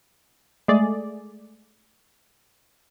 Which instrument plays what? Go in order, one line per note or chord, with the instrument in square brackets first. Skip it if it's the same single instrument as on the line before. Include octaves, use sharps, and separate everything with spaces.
[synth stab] G#3 A3 G#4 D5